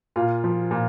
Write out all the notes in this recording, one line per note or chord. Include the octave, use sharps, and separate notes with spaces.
A#2 F4
F3
A#2